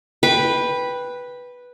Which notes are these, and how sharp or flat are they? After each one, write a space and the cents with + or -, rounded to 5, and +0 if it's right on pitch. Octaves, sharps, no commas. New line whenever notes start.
B4 -5 G5 +10